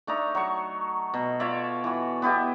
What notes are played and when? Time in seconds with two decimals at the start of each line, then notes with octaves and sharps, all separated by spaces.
0.07 A3 D4 D#4 A#5
0.35 F#3 C#6
1.14 B2
1.40 F4 C#5 D5 E5
1.84 E3 F#4
2.22 B3 E4 G4 D#5